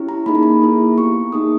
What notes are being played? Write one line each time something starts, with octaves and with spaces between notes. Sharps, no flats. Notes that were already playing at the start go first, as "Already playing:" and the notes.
Already playing: C#4 E4 G4
A#5
A#3 D#4 G#4 B5
A#5
B5
A#3 E4 G#4
B3 G4 C#6
A#3 D#4 G#4 D#6